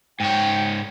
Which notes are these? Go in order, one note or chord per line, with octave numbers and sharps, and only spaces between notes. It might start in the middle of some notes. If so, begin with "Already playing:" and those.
G#2 C#5 G5